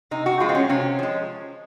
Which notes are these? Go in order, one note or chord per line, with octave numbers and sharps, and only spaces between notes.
C3 D#4
F#4
F3 G#3 F4
C4
C#4
C3 C#4
F3 G#3